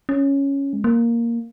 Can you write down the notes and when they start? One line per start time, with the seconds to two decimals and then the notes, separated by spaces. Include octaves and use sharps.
0.09 C#4
0.73 G#3
0.84 A#3